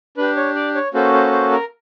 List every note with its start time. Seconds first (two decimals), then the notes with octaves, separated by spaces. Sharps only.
0.17 D4 G4 B4
0.36 C#5
0.55 D5
0.75 C#5
0.94 A#3 C#4 F#4 A4 C5
1.13 C5
1.32 C5
1.51 A#4